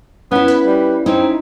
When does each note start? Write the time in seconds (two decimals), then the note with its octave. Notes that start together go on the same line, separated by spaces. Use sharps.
0.31 B3 C#4 E4
0.48 B4
0.66 G3
1.06 C4 C#4 D#4 E4